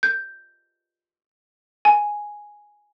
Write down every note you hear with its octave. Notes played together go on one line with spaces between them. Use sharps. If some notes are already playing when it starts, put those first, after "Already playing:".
G6
G#5